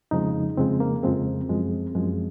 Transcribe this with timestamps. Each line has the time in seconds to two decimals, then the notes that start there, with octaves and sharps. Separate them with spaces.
0.11 F2 C#3 F3 G#3 D#4
0.57 F2 C#3 F3 G#3 C4
0.80 A#3
1.03 F2 C#3 F3 G#3 C4
1.49 F#2 F3 G#3
1.95 F#2 F3 G#3